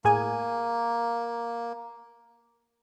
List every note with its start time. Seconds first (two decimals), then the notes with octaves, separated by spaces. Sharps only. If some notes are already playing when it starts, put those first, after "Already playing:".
0.05 A2 A#3 G#4 G#5